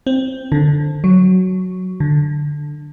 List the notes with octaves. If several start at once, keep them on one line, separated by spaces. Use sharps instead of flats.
C4
D3
F#3
D3